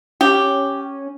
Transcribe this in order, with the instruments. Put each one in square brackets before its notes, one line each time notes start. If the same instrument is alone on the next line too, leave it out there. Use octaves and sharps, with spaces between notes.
[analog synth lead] C#4 [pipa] G4